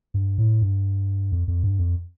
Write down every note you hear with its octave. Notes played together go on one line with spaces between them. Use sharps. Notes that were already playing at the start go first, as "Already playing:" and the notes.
G2
A2
G2
F2
F2
G2
F2